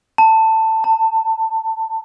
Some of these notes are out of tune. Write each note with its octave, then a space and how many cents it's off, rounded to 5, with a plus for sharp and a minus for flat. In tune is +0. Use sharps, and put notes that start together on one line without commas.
A5 +15
A5 +30